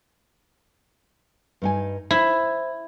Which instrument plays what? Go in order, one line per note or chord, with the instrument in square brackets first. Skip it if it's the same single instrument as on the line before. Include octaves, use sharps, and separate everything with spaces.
[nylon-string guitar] G2 D#4 G#5
[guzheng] E4 [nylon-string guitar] C5